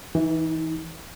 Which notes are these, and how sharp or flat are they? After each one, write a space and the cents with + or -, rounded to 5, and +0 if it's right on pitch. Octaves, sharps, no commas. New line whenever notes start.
E3 -15 D#4 +35